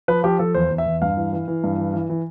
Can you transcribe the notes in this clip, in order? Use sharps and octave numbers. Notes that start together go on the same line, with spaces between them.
F3 B4
F3 G4
F3 A4
E2 C5
E2
E5
E2
G2 F5
E3
E3
E3
G2
E3
E3
E3